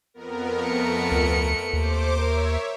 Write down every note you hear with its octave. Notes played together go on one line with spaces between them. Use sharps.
F2 B3 A#4
A3 C#7
D2
D#2 C5 D6
A#4 C#5 E5